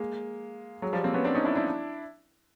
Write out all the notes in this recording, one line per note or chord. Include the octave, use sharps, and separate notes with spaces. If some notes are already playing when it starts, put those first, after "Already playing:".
Already playing: G#3 A#3
F#3 G#3
F3 G3
A#3 C4
B3 C#4
C4 D4
C#4 D#4
D4 E4
D4 E4